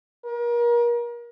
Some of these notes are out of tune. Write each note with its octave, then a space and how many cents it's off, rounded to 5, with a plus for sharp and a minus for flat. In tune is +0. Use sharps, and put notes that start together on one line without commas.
A#4 +35